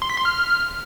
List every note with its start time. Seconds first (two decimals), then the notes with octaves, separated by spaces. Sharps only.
0.02 C6
0.10 B6
0.17 C6
0.25 F6